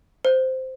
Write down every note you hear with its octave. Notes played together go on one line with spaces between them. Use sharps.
C5